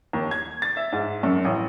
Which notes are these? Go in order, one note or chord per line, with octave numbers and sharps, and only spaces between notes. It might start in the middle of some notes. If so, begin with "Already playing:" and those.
D#2
G#6
A6
E5
G#2
F#2
A1